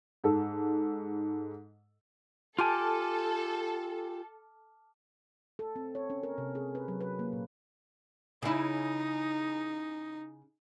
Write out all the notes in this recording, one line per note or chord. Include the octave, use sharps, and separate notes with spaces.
G#2 A4
F4 G4 A4 G#5 A5 D6 F6
A4
C4
C#5
C#4
A#4
C3
G#4
B4
F#3
B4
A#3
A#2
C#3 D#4 E4